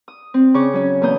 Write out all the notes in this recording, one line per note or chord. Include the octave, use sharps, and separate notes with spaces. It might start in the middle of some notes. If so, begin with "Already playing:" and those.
D#6
C4
C#3 C#6 D6
F#3 C#4
E2 A#3 D#6 G6